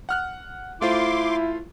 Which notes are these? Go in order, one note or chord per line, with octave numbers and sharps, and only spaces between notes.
F#5 F6 F#6
A3 E4 F4 C5 C6 D6